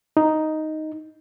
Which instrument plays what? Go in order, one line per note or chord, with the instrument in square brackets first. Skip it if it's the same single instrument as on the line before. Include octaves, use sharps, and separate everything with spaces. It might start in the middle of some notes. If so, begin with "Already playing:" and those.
[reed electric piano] D#4